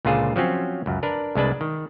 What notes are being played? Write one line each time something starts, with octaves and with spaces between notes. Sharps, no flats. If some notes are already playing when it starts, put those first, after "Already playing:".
C#2 A#2 D3 F4 G#4 C5
F3 F#3 C4 C#4
C#2 F#2
D4 A#4 B4
C2 G#3 D4 B4 A5
D#3